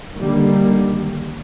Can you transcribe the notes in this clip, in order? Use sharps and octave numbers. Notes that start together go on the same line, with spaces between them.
D3 D#3 G3 A#3